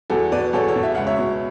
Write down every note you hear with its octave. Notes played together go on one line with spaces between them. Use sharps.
E2 F#4 A4
B2 B4 D5
E2 A4 C#5
A4 C#5
B2
E5
C#2 F#5
C#5 E5
B2